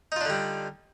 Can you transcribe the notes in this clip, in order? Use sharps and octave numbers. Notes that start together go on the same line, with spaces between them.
D3 G3 D4 D#4 F4